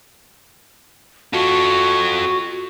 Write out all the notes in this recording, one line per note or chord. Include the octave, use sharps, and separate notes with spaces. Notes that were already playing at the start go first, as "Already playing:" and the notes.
F4 F#4 A4